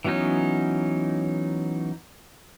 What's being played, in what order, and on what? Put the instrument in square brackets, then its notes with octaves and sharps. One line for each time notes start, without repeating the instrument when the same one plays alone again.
[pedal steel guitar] E3 F#3 B3 C#4 D#4